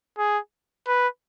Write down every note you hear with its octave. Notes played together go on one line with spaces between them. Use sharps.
G#4
B4